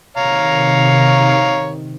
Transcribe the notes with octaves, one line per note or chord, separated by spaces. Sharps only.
C3 D#3 C#5 F5 A#5